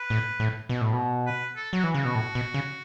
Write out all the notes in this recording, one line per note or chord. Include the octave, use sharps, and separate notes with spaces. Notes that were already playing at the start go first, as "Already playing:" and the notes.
Already playing: B4
A2
A2
B2
A2
B2
B4
A4
F#3 F#4
E3
C#3 F#4
B2
A2
B2
C#3